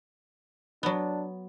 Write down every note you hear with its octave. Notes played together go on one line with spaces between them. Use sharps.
F#3 B3 D4